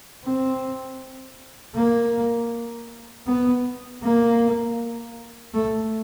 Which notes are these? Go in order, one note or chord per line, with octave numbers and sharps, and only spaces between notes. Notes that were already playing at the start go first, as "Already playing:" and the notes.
C4
A#3
B3
A#3
A3